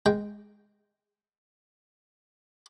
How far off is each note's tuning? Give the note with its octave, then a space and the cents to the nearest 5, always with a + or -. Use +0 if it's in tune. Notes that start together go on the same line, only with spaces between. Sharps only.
G#3 -5 G5 -5